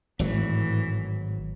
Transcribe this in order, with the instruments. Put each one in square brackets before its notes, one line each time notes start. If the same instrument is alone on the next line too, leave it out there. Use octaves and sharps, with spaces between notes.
[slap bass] G#1 F#3 [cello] A2 E3